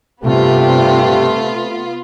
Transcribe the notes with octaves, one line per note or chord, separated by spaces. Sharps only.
G2 C3 A3 B3 F4 G4